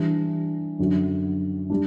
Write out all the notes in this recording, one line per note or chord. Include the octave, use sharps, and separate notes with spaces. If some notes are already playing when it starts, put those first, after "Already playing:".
Already playing: E3 G3 D4
F#2 D3 F#3
G3 D4